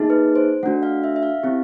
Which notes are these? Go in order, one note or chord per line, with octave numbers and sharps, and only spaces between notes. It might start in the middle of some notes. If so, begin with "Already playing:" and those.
Already playing: A#3 D#4 G#4
B4
C5
A3 D4 F#4 F#5
F5
E5
E5
F5
C4 E4 G4